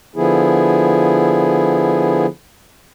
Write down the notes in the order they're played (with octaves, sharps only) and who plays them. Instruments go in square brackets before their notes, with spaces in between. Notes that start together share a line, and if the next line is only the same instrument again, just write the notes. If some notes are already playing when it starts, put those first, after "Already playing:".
[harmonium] D3 F3 B3 E4 G#4